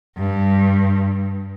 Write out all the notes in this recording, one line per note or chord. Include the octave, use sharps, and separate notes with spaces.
G2